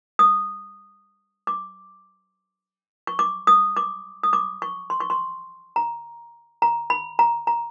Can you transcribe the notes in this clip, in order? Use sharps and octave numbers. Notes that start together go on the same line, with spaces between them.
D#6
D6
C#6
D6
D#6
D6
D#6
D6
C#6
C6
C#6
C6
A#5
A#5
B5
A#5
A#5